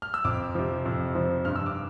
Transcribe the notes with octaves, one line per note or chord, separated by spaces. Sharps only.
F6
E6
F2 D6
C3 F3
F2
C3 F3
G2 F6
E6
D6